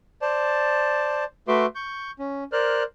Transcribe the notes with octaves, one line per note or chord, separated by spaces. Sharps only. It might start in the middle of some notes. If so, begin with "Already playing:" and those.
C5 D5 A5
A3 F#4 B4 E5 C6 D6
C#6 G6
C#4
A#4 C5 D5 F6 F#6